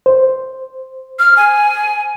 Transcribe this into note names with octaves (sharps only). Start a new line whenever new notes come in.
C5
F6
G#5